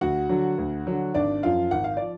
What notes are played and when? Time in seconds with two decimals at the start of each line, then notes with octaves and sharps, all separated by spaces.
0.01 D2 F#4 F#5
0.29 D3 F#3
0.58 D2
0.87 D3 F#3
1.14 G#1 D4 D5
1.43 F#2 F3 F4 F5
1.71 G#1 F#5
1.84 F5
1.97 F3 D5